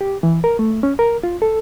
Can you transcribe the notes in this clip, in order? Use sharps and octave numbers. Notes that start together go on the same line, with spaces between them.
G4
E3
A#4
A3
C#4
A#4
F4
A4